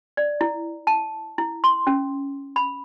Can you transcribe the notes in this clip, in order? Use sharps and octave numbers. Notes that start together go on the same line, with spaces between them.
D5
E4
A5
E4
C6
C#4
B5